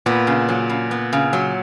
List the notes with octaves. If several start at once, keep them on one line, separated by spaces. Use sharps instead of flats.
A#2 B3
C#3
F#3
C#3
B3
C#3
F#3